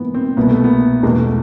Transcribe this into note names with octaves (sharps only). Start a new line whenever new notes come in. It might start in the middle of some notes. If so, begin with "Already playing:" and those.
Already playing: G#2 E3 B3
C4
C2 B2 B3
A3
B3
E2 B2 G#3
A3